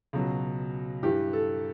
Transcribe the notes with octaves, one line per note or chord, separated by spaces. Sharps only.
C#2 B2 F#3
G2 E3 G4
A4